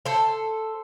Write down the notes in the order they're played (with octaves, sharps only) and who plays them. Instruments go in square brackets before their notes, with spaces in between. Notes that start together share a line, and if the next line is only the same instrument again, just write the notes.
[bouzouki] A4 C5